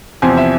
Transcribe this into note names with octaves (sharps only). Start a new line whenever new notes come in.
E2 C3 F3 C4 G#5
E5